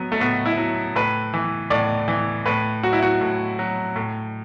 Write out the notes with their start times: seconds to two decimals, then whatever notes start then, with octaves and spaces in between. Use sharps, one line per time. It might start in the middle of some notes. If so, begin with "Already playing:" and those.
Already playing: A2 F#3 B3
0.12 A3
0.20 A2 B3
0.46 E4
0.58 F#3
0.96 A2 B4
1.34 E3
1.70 A2 D5
2.08 E3
2.46 A2 B4
2.83 F#3 F#4
2.93 E4
3.03 F#4
3.21 A2
3.59 F#3
3.96 A2